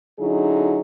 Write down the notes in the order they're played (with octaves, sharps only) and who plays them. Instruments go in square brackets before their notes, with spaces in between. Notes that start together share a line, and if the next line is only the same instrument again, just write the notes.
[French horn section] D3 F#3 C#4 D#4 E4 G#4